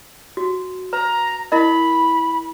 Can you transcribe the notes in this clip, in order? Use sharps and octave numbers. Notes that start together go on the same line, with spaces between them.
F#4
B4 A#5
E4 A#4 D#5 B5